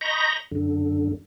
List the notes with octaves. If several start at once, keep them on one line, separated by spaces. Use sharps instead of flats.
D#5 A#5 B5 C#6 G6 A#6
F#2 D3